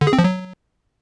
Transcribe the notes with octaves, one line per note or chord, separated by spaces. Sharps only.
D3
G#4
C4
F3
F#3